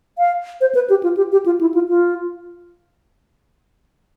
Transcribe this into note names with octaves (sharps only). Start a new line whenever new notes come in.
F5
C5
B4
G4
F4
G4
G4
F4
E4
F4
F4